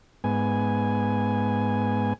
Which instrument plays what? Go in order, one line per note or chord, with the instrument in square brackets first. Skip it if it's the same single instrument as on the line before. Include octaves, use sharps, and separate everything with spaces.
[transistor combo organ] G#2 B3 G#5